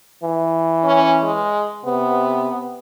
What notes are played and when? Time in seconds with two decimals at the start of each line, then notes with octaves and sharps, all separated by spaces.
0.24 E3
0.84 C#4
1.23 G#3
1.85 C3 B3